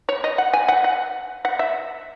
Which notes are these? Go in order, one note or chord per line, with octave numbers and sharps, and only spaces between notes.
C#5
D#5
F#5
G#5
F#5
F#5
F#5
E5